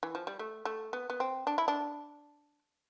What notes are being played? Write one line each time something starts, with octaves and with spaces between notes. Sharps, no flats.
E3
F3
G3
A3
A3
B3
B3
C4
D4
E4
D4